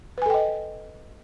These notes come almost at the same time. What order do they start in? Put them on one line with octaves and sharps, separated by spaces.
B4 G#5 A4 G5 D#5